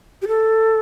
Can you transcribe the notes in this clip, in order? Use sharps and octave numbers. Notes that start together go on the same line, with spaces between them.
G4
A4